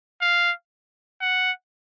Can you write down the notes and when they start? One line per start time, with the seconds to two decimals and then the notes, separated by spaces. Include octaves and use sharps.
0.21 F5
1.21 F#5